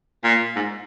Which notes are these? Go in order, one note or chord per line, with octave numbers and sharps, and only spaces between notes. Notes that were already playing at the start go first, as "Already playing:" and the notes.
A#2
G#2